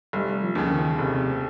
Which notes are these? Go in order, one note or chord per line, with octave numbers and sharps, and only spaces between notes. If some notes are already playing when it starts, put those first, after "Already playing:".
F1 G3
F3
D#2 C#3
D#3
F1 C3